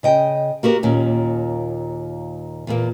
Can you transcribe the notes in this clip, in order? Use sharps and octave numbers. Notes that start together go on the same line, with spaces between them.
C#3 D#5 G5
A#3 F#4 G4 A#4
D#2 A#2 C#4
E2 A#2 A#3